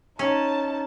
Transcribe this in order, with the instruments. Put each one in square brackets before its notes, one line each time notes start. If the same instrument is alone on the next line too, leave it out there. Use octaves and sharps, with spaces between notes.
[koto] C#4 [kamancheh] D#4 A5